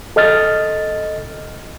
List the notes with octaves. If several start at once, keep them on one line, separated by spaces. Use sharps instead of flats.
A4 D#5 F6 A6